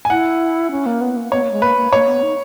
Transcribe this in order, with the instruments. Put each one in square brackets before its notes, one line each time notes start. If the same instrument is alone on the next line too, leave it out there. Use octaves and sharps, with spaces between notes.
[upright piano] G#5
[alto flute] E4 [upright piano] F#5
[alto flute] C#4
A#3
B3
A#3
[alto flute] B3 [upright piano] C#5
[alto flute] A#3
G#3
[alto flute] A#3 [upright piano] B4
[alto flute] A#3
[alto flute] A#3 [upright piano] C#5
[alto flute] B3
D#4